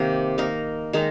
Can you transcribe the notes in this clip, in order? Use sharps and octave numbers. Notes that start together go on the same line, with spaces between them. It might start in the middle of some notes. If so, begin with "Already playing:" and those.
Already playing: C3 D#3 A#3
A#3 D#4 A#4
D#3 G#3 D#4 A#4